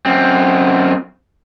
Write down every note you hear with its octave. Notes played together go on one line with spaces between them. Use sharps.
F#2 C4